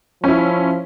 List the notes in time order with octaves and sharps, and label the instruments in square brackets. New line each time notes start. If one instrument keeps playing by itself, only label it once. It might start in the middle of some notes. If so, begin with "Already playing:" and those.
[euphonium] F3 [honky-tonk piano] C#4 E4